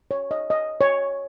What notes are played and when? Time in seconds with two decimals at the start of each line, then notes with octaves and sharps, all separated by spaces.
0.11 C#5
0.31 D#5
0.50 D#5
0.81 C#5